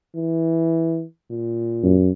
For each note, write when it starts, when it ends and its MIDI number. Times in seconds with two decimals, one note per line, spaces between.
0.15 1.03 52
1.30 1.99 46
1.83 2.10 42